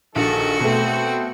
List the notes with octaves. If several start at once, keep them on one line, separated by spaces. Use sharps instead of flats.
A#1 D#3 F#4 A4 C#7
B2 A3 C4